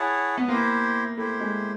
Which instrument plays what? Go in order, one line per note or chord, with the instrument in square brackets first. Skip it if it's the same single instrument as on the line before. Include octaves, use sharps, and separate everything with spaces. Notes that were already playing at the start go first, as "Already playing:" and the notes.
Already playing: [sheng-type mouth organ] E4 G#4 C#5 F#5 A5
[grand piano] B3
[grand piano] A#3 [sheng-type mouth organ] E4 G4 C5
[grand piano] A3 [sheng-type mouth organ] E4 G4 C5
[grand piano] G#3